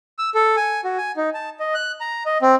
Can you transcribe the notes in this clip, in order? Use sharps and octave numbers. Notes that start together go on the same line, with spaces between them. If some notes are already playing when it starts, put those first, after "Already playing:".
E6
A4
G#5
F#4
G#5
D#4
A5
D#5
F#6
A#5
D#5
C4